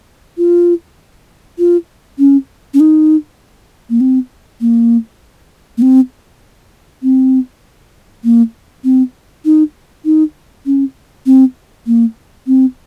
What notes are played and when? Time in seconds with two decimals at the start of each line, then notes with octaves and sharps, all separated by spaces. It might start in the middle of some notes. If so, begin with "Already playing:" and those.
0.38 F4
1.59 F4
2.19 C#4
2.74 C#4
2.80 D#4
3.90 A#3
4.00 C4
4.61 A#3
5.78 A#3
5.82 C4
7.03 C4
8.24 A#3
8.84 C4
9.45 D#4
10.05 D#4
10.66 C#4
11.26 C4
11.87 A#3
12.47 C4